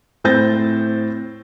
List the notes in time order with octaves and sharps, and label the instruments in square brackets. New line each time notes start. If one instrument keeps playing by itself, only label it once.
[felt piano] A2 C4 C5 G6 A6 A#6